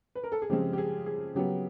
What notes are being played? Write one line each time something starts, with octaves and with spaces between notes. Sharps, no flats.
B4
A#4
A4
G#4
C#3 F3 G#3 C4 G4
G4
G#4
G#4
C#3 F#3 B3 G4